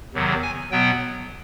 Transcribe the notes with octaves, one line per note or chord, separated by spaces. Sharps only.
E2 C3 D#3 F#3
G#5
B2 F#3 B3 G5